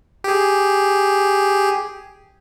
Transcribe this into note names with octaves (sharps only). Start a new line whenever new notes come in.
G4 G#4